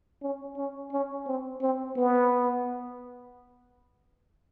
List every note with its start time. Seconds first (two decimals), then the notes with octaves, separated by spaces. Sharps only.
0.22 C#4
0.57 C#4
0.92 C#4
1.26 C4
1.61 C4
1.96 B3